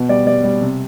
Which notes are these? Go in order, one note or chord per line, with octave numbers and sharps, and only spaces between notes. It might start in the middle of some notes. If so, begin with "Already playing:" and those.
Already playing: B2
G3 D5
G3 D5
G3
C3